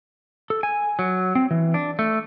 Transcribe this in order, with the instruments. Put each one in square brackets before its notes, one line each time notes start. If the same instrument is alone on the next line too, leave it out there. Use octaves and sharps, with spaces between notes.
[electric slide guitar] A4
G#5
F#3
C4
E3
D4
A3